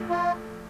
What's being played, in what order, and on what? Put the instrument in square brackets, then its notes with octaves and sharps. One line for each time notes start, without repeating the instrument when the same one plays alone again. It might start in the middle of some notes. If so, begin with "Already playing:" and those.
Already playing: [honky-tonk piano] A#1 A2 A3
[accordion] F4